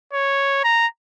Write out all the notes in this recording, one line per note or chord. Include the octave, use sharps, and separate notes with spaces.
C#5
A#5